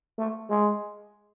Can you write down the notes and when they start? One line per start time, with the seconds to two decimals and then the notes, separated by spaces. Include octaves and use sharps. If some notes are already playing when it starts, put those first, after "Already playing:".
0.18 A3
0.50 G#3